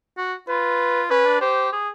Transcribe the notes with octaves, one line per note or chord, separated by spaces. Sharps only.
F#4
F4 B4
C#4 B4
D4
G4 C5
G#4